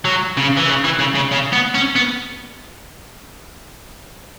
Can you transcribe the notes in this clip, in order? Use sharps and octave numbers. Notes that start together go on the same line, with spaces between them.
F#3
C#3
E3
C#3
E3
C#3
C#3
C#3
B3
C#4
B3